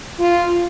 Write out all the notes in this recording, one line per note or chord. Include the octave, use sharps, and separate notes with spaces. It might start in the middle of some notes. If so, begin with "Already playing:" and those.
F4